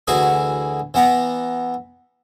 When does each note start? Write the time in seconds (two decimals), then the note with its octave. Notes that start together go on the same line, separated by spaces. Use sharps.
0.07 D2 E3 E4 F#4 G#4 D#6
0.94 E3 B3 F#5 A#5